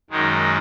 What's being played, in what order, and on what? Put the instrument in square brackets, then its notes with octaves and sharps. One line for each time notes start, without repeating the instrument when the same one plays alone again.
[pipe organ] F#2 D#3 G#3 D#4